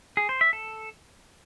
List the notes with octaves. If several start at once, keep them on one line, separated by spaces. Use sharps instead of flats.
G#4
C5
E5
A4